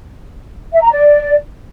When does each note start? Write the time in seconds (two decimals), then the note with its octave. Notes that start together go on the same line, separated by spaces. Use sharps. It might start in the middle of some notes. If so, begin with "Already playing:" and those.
0.72 E5
0.82 A#5
0.91 D5